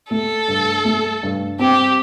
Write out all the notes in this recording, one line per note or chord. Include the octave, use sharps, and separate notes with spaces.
A3 A4
G2
A3
G2
C4 G4